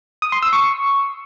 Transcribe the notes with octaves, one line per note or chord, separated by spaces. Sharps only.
D#6
C6
E6
C#6